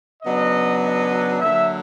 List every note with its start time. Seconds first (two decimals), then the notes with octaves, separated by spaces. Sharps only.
0.22 C#3 F#3 B3 D4 D#5
0.81 D#5
1.40 D3 F#3 A#3 E5